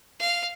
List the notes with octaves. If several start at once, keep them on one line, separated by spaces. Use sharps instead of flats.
F5